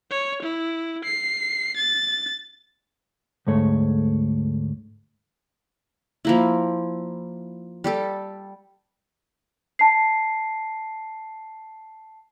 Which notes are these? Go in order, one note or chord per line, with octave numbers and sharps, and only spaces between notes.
C#5
E4
C7
A6
D2 G#2 A3 C#5
F3 A#3 E4
G3 G4 A4
A5 C7